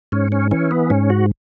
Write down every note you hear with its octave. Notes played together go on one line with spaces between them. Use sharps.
G#2 C#4
C#4
E3 C#4
B3
G#2 C#4
F#4